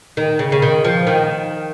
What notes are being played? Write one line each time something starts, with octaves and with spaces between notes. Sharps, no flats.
D#3
C#3
C#3
D#3
F3
D#3